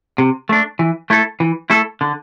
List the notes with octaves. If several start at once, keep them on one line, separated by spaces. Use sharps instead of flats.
C3
A3 D4
E3
A3 E4 A4
E3
A3 E4 A4
D3